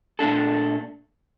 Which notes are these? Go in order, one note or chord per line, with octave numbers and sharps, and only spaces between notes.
A#2 A3 D4 A4